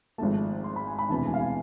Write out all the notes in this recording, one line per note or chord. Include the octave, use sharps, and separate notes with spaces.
G#1 G#2 F3 A3 A5
C6
B5
G#5
B5
E1 D2 C3 E3 A5
G#5
F5
G#5